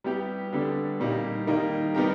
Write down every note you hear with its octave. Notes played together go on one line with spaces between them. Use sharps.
G3 B3 E4 G4
D3 G3 B3 D4
A#2 G3 A#3 D#4
D#3 G3 A#3 D#4
G3 B3 D#4 G4 A#4